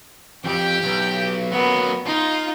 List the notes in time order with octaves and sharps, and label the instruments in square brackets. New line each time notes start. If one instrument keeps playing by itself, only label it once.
[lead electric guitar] F2 [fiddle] G4 G5
[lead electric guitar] B1
[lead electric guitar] F#3 A#3 [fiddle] B3
[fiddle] D#4 [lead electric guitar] F4